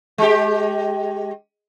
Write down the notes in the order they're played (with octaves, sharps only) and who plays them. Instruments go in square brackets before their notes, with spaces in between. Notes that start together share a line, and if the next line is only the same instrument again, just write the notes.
[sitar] G#3 G4